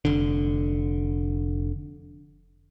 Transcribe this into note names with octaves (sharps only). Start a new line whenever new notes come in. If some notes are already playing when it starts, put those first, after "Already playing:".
F1 D3